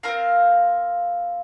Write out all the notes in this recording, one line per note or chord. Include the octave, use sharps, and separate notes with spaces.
C4 F4 A#4 F5